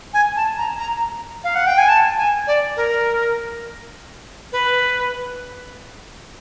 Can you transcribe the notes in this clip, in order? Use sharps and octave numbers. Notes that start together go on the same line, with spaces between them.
G#5
A5
A#5
A#5
F5
F#5
G5
G#5
A5
G#5
D5
A#4
B4